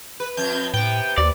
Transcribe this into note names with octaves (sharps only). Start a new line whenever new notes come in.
B4
F2 G6 G#6
A2 C3 B3 G5
D#2 D5